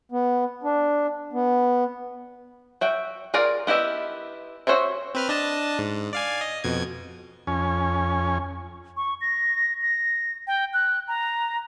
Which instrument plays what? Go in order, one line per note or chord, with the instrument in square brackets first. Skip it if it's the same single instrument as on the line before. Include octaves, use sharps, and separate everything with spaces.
[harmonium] B3
D4
B3
[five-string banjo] F#4 E5 G5
F4 G#4 A#4 D5
B3 E4 G4 D#5 E5
F#4 A4 C5 C#5 E5
[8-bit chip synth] C4 B4 F6
D4 D#5 A5
G#2
D5 F5 G#5
D#5
F2 B2 G#6
[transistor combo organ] F2 C#4 G#5
[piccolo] C#6
A#6
A#6
G5
F#6
A#5